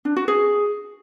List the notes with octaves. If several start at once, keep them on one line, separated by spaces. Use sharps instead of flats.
D4
F#4
G#4